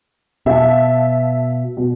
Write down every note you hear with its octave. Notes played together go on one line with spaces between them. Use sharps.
B2 E5 F5 A5
B2